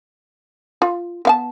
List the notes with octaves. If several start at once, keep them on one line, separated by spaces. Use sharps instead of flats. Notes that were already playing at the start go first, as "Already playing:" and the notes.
F4
B3 F5 A5